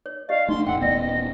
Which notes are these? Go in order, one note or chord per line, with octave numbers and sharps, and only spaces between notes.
C#5
G4 D5 D#5 F5
A3 D4 D#4 C6
E1 A2 F#5 G5 E6
D#1 B3 D5 D#5